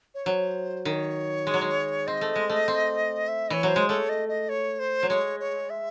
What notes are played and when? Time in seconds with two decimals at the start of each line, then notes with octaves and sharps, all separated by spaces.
0.14 C#5
0.25 F#3 C5
0.85 D#3 C#5
1.47 G#3
1.54 F#3
1.61 G#3
2.07 C4 D#5
2.21 A3
2.36 G#3
2.50 A3
2.68 C4
3.28 E5
3.48 E3 C#5 D#5
3.63 F#3 C5
3.76 G#3
3.89 A3 C#5
4.09 D#5
4.28 D#5
4.49 C#5
4.79 C5
5.03 F#3
5.09 G#3 C#5
5.40 C#5
5.70 E5